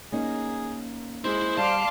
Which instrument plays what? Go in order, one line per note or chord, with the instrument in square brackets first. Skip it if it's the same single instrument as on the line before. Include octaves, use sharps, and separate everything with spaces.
[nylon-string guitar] A#3 C#4 D#4 [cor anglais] G#4
[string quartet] G#3 [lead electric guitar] E4 [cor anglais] C5
[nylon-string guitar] G3 [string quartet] F5 C6 D6 [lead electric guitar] A5